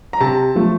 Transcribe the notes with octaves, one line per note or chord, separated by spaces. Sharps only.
A#5
C3 A5
F3 A3